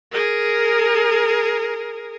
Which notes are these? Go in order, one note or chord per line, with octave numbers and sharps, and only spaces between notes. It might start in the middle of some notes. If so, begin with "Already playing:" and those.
G#4 A#4